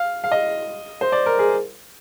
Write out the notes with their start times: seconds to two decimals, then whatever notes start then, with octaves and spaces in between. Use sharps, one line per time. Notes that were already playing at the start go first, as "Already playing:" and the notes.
Already playing: F5
0.24 F5
0.32 D#5
1.01 C5
1.12 D5
1.26 A#4
1.39 G#4